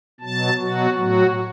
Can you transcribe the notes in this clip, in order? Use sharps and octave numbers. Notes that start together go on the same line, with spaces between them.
B2 F#3 A5
B2 F#3 F#4
A2 F#3 F#4